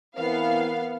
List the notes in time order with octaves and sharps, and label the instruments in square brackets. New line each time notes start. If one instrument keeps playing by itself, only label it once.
[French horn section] E3 C4 A#4 [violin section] B3 F5